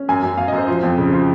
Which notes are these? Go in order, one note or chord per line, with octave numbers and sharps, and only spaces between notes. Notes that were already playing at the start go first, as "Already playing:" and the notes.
Already playing: C#4
F#2 G#5
F#2
F#2 F5
D#5
F#2
C5
F3
F2
C#3
F3